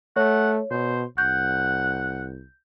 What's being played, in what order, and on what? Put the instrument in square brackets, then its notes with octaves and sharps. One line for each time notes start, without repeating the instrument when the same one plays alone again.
[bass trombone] A3 [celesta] C#5 [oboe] F#5
[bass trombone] B2 [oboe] C5
[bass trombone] C2 [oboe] F#5 [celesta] G6